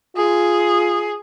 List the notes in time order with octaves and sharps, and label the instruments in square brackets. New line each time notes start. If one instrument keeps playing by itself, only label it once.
[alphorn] F4 [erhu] G#4